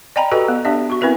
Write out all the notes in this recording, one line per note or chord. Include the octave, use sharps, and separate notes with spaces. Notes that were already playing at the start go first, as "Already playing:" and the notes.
D5 D#5 G5 G#5 A#5 B5
F#4 G4 A4 B4 D#5 G#5
B3
B3 D4 G4 D5 E5
F#4 C#6
B3 C4 E4 A#4 B4 E5